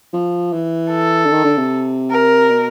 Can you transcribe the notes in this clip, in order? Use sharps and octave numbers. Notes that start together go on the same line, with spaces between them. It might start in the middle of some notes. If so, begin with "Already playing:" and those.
F3
E3
A4
D3
D#3
D3
C3
A#4
B2